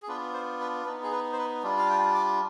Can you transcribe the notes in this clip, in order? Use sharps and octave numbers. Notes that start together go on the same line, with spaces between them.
G#4
B3 D4 F4 B4
C5
B4
B3 D#4 B4
G#4
B4
C5
B4
G3 D4 F4
F5
G5
D6